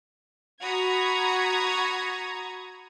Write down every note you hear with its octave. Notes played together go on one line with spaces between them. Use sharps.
F#4 A#5 B5 C#6 D#6 G#6